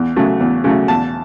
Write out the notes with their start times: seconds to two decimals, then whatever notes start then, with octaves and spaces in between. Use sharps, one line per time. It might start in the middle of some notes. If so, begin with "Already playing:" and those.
Already playing: E2
0.16 C#3 F#3 A3
0.41 E2
0.64 C#3 F#3 A3
0.88 E2 A5